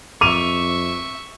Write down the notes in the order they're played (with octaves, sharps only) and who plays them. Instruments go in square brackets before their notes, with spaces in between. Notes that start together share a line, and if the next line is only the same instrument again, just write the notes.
[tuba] F2 [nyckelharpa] E5 C#6 [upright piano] D6 D#7 F7